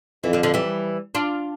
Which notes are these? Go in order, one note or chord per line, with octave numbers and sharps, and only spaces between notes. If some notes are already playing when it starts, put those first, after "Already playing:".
F2 E3
D3 F3
D3 F3
E3 G3
D4 F4